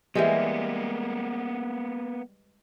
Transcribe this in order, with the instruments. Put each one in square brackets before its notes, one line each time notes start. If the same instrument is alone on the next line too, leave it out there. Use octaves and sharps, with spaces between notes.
[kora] E3 G3 G#3 [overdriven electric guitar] A#3 B3